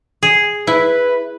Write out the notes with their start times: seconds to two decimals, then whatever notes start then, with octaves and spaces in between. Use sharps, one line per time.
0.23 G#4
0.67 E4 B4